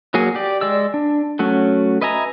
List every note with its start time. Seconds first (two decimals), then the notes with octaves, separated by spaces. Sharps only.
0.14 F#3 A#3 F#4 G#4
0.35 G4 D5
0.61 G#3 D5 E6
0.94 D4
1.39 F#3 A3 C#4 F#4
2.02 B4 D#5 E5 G#5 A#5